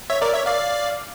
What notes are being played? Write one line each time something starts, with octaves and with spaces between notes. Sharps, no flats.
C#5 E5
A#4 D5
C#5 E5
D5 F5